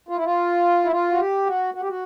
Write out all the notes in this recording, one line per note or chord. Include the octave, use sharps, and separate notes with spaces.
F4
E4
F4
E4
F4
F#4
G4
F#4
F#4
G4
F#4